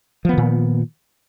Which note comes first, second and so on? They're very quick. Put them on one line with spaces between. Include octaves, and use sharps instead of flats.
F3 B3 D#3 A#2